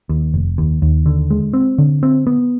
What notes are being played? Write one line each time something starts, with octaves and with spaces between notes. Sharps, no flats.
D#2
F1
D#2
D#2
D3
G#3
C4
D3
C4
B3